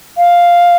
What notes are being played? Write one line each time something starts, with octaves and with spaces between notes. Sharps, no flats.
F5